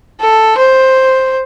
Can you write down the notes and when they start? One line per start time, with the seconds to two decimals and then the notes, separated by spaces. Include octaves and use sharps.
0.21 A4
0.58 C5